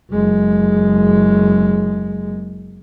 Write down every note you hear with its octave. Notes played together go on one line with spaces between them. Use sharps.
F#1 G#3